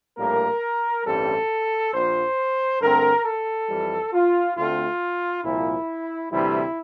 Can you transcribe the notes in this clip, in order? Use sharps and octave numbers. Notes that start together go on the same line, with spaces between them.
A#1 A2 G3 A#3 A#4
A1 G2 E3 G3 C4 A4
A#1 A#2 F3 C5
G2 D3 A3 C4 A#4
A4
F2 E3 G3
F4
D2 D3 A3 C4 F4
C2 A#2 F3 A#3 E4
D2 C3 E3 G3 E4